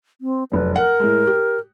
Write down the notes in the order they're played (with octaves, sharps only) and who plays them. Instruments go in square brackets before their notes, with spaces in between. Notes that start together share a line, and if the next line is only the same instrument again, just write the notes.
[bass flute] C4
[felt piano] F1 F#2 [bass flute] B4
[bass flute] A#4 [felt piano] F#5
[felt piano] A2 G#3
G4